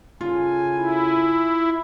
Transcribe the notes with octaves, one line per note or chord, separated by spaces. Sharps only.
C#3 F4 A4 G#5
E4